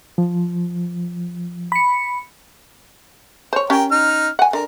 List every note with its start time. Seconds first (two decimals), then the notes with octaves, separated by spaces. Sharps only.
0.18 F3
1.72 B5 C#7
3.53 C5 C#5
3.70 C#4 G4 A#4 G5
3.91 D#4 F6
4.39 F#5 G#5
4.53 D3 A#4